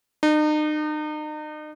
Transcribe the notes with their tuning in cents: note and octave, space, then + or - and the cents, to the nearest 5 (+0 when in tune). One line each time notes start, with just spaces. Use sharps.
D#4 -40